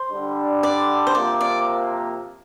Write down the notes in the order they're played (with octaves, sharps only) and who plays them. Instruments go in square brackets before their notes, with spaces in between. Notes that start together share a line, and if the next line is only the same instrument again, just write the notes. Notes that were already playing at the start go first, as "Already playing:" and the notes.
Already playing: [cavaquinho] C5
[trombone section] D3 G3 D4
[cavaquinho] D5
C5
[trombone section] C3 F3 A#3 [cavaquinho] D5
[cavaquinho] D5